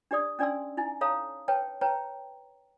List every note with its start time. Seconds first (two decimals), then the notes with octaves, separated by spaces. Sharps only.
0.11 D4 G4 D5 D#6
0.39 C#4 D4 D5 G#5 C6 E6
0.77 D#4 E4 G#5
1.01 A4 C#5 F5 A5 A#5 D#6
1.48 B4 C#5 G5 A5
1.81 B4 C#5 G5 A5 A#5